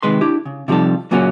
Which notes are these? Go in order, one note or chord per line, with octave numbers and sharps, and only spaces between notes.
C3 D#3 G#3 B4 C6
D4 E4 G4
C#3
C3 F3 G3 D#4 A4
F#2 A#2 C#3 F#3 A#3 C#4